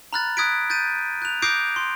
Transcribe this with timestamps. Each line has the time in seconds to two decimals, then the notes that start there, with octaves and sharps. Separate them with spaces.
0.13 A#5 B5 F6 F#6 A6
0.37 D#6 F#6 G#6 B6 D7
0.70 G6 A6 D#7
1.22 F#6 F7
1.42 D6 D#6 G6 A#6 C7 D7
1.76 C6